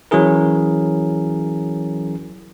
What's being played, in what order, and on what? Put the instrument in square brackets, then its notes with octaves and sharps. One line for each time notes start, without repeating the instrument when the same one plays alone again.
[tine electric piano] E3 F#3 C#4 E4 G#4 A#4